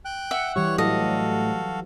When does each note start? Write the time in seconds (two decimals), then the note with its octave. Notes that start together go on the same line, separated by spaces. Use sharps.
0.05 G5 F#6
0.31 E5 F#5
0.56 E3 G3 G4 C#5 C#6
0.78 A2 F#3 F#4 A4 D#5 F5